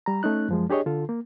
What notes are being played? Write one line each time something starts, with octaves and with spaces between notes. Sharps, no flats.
G3 A#5
A3 C#4 D#4 F#6
F#2 F3 G#3
D4 G4 G#4 C#5 D#5
D3 F4 A4
A#3